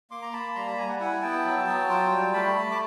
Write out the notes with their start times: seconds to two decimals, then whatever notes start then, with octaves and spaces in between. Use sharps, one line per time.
0.11 A#3 C6 D6
0.22 A#5
0.33 A#3 A5 B5
0.55 G3 A#5 C6
0.67 A5 B5
0.77 G3 G#5 A#5
0.89 F#5 G#5
1.00 E4 F#5 G#5
1.22 B3 G5 A5
1.45 F#3
1.67 F#3
1.89 F4
2.11 G3
2.33 A3 A5 B5
2.56 A3
2.71 D6